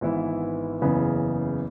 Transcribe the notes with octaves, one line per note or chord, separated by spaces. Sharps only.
G#1 G#2 E3 B3 E4
F#1 E2 C#3 E3 B3